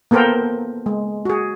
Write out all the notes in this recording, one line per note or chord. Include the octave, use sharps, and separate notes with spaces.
A#3 B3 A4 A#4 C5 G5
G#3
F#4 G#4